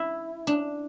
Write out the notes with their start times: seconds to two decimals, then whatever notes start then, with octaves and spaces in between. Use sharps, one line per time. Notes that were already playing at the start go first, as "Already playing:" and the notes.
Already playing: E4
0.47 D4